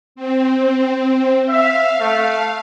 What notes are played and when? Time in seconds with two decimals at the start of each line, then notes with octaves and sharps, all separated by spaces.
0.16 C4
1.48 E5 F5
2.00 A3